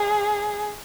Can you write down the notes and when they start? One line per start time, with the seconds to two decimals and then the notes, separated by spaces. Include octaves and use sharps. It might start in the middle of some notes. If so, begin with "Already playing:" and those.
Already playing: G#4